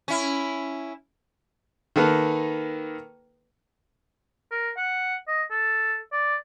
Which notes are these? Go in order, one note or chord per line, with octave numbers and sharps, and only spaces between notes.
C#4 E4
D#3 A#3 A4 B4
A#4
F#5
D#5
A4
D5